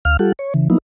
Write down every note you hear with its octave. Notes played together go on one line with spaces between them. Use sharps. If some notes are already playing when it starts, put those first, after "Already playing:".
D2 F5 F6
G3 F4 G4 A4 F#5
C#5
C#3 E3
F3 F#3 A#3 B3 D#4 E4